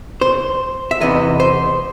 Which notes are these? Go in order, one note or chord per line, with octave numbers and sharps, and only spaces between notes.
C5
E5
E2 C3 E3 B3 D#4 D#5
C5